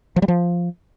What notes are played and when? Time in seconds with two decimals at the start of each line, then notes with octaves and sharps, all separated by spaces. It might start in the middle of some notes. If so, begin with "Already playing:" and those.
0.16 F3
0.22 G3
0.28 F3